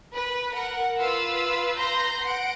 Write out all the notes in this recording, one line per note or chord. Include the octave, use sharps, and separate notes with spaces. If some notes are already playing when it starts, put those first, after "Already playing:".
B4
A#4 F#5
F4 B4 F5 E6
B4 A#5 C6 G6 A#6
F#5 D7